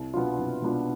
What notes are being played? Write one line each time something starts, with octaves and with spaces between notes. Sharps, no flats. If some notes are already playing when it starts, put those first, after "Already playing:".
Already playing: C2
B2 B3 D4 F4
C2
B2 B3 D4 F4